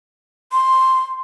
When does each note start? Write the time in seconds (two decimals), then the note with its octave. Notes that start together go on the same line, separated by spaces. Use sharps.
0.52 C6